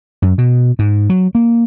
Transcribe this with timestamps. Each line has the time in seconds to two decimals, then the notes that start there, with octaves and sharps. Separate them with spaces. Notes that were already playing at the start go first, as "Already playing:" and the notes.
0.22 F#2
0.38 B2
0.79 G#2
1.10 F#3
1.35 A#3